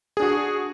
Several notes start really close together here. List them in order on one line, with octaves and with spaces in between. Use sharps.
G#4 D4 F#4